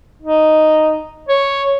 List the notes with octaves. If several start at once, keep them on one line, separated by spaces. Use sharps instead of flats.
D#4
C#5